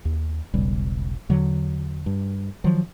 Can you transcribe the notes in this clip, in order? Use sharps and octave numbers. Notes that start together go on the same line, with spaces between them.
D#2
E1 B1 C#3 G3
E2 D3 F#3
G2
D#3 F3 F#3